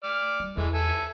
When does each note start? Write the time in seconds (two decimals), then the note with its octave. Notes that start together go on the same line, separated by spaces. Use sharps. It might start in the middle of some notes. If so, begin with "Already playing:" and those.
0.04 D5 F6
0.40 G3
0.57 E2 E3 G#3 A3
0.74 A4 E5 G#5